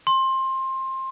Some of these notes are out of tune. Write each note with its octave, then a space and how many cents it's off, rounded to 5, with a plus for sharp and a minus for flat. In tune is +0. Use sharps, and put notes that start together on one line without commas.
C6 +20